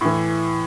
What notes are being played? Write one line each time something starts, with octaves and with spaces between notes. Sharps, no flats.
A2 E3